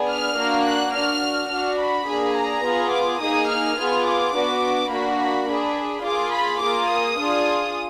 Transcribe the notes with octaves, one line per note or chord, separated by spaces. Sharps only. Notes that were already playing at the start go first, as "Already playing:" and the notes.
Already playing: B3 D4 G#4
F6
A#3 D4 F#4
F#6
D4 F#4 F6
D4 F#4 F6
B5
A#3 D4 G#4
A#5
B3 F4 G#4
D6
A#3 D#4 G#4 D#6
F6
B3 F4 G#4
D6
B3 D4 F#4
A#3 D4 F#4 B5
B5
D4 G#4 B5
A#3 F4 G#4 D6
B5
A#3 F4 G#4 D6
D#6
D4 F4 G#4